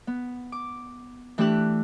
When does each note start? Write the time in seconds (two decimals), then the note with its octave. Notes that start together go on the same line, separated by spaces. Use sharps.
0.07 B3
0.52 D6
1.38 E3 A3 D4 G4 E6 F#6